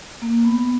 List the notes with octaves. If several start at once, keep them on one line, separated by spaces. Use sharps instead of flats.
A#3
B3